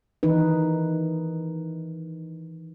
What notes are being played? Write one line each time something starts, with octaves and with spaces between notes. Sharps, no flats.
D#3 E3 D#4 B4